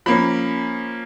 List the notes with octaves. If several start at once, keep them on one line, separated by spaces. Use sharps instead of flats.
F3 A#3 C#4 B5